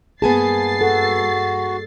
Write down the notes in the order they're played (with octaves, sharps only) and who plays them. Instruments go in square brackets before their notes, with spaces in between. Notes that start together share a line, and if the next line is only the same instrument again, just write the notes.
[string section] G2 A6 C7 [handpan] A#3 G#4 [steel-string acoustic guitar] B3 G#5 A5
[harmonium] F#4 [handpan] A4